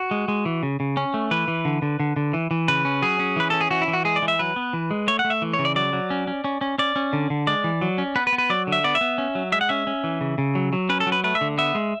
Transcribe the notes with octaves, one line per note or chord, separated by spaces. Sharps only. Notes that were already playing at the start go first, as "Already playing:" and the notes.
Already playing: F#4
G#3
G#3
E3
C#3
C#3
C#4
A3
E3 B4
E3
D3
D3
D3
D3
E3
E3
C#3 B4
C#4
F#3 G#4
C#4
E3 B4
C#4 A4
G#4
E3 F#4
E4
E3
F#4
G#3 G#4
D5
E3
E5
F#3 B4
B3
E3
G#3
A3 C#5
F#5
A3
E5
E3
C#5
C#3
D5
F#3 D5
F#3
C#4
C#4
C#4
C#4
C#4 D5
C#4
D3
D3
G#3 D5
E3
F#3
C#4
B3 B4
B4
B3
B4
F#3 D5
D3
E5
B3 D5
E5
B3
C#4
F#3
G#3 E5
F#5
C#4 E5
C#4
E3
C#3
C#3
F#3
F#3
C#4 B4
A4
F#3
B4
A3 B4
E5
D3
B3 E5
G#3